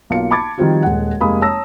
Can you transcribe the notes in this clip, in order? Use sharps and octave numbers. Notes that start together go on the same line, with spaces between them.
B1 A#3 F4 C#7
A5 B5 D6 G#6 A6
D#3 F3 G3 C4 F4 F#4
D#1 G#3 F#5
F1 G#3 A#3 G4 B5 D#6
C#5 A5 A#5 E6 A#6